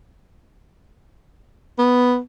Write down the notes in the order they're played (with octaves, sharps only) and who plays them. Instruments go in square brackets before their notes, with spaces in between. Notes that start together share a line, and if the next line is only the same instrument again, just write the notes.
[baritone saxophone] B3